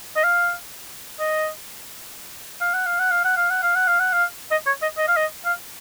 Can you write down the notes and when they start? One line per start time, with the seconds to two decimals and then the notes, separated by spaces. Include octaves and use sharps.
0.16 D#5
0.24 F5
1.19 D#5
2.61 F5
2.74 F#5
2.86 F5
2.99 F#5
3.11 F5
3.24 F#5
3.37 F5
3.50 F#5
3.62 F5
3.75 F#5
3.87 F5
4.00 F#5
4.13 F5
4.51 D#5
4.66 C#5
4.82 D#5
4.97 D#5
5.08 F5
5.17 D#5
5.45 F5